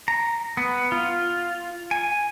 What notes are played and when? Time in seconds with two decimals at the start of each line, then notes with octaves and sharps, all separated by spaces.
0.08 A#5
0.57 B3
0.92 F4
1.91 G#5